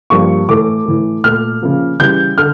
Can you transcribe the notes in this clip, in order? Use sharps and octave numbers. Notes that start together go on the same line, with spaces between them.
G2 F3 A#3 C#6
A2 E3 A3 D6
A2 E3 A3
A#2 A3 F6
C#3 F3 A#3
C#3 E3 G3 G6
D3 F6